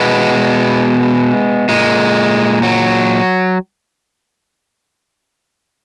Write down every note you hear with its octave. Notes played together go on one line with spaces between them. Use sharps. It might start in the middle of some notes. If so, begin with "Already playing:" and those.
Already playing: B2 G#3 B3
A#2 G#3
F#3